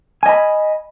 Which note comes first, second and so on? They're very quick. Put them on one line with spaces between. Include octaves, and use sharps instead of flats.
G#5 D#5 B5